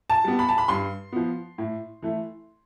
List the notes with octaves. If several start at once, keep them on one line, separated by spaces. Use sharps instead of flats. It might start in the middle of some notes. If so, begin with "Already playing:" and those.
A5
G3 B3
B5
A5
B5
G2 C6
F3 B3
A2
E3 A3